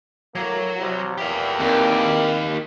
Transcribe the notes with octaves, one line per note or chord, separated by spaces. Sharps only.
A2 F#3 A#3 C#5 G#6
C2 C3
E2 A#2 G4 F5
D#2 C4 A#4